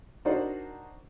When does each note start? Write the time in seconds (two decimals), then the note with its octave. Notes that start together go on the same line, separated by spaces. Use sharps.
0.25 D4 D#4 F#4 A#4 C5 D5